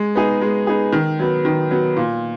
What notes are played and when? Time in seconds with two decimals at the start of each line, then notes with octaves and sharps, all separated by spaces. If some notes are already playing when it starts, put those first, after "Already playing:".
Already playing: G#3
0.15 B3 D#4 G#4
0.42 G#3
0.67 B3 D#4 G#4
0.92 D#3
1.19 F#3 B3
1.45 D#3
1.71 F#3 B3
1.97 A#2